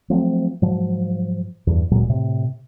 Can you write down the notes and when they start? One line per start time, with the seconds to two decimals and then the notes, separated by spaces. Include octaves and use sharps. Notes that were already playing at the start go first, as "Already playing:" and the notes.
0.10 F3 F#3 A3 C4
0.62 G#2 F3 F#3
1.67 E2 G2
1.91 D1 A#2 F#3 G#3
2.09 A2 C3